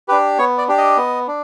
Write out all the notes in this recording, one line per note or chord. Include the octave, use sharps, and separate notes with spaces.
D4 G4 B4
B3 C#5
D5
D4 G4
D#5
B3
D4